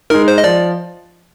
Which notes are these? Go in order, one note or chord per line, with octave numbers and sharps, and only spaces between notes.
G#3 D#4 A#4
C5
D#5
F3 D5